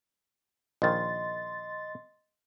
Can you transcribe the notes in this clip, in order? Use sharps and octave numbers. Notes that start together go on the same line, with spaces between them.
A#1 D#3 D#5 C6 A6